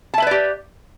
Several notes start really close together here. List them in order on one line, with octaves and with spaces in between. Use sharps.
A5 E5 B4 D5 G4